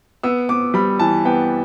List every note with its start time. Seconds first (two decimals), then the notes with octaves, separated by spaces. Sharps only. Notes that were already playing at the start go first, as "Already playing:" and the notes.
0.23 B3 E6
0.49 B3 D6
0.74 G3 B5
0.99 E3 A5
1.25 B3 G5